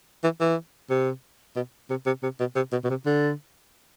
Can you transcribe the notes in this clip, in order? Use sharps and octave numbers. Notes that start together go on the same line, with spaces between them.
E3
E3
C3
B2
C3
C3
C3
B2
C3
B2
B2
C3
D3